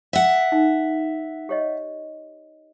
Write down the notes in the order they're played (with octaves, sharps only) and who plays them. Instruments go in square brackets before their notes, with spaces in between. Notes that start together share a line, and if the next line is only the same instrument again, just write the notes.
[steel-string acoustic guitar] E5 F#5
[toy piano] D#4
G4 C#5 D#5